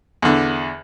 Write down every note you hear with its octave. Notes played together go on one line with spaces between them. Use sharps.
E2 D3